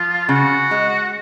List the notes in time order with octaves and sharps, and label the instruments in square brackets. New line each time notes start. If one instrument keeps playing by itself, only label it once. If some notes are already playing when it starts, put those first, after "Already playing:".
Already playing: [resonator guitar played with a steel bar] F3 [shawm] F4
[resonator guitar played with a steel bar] C#3 [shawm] F#4
[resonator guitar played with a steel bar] G#3